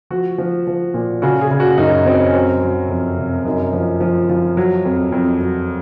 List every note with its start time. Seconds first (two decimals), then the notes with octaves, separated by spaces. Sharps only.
0.10 F3 F#4
0.38 F3
0.67 F3
0.94 A#2
1.22 C#3 F#4
1.41 G#4
1.51 C#3
1.60 F#4
1.78 F#2 D#4
2.06 F#3 C4
2.25 C#4
2.34 F#3 C4
2.62 F#3
2.89 F2
3.18 C3
3.45 F#2 D#4
3.73 F3
4.00 F3
4.29 F3
4.57 F#3
4.85 F2
5.12 F2
5.41 F#3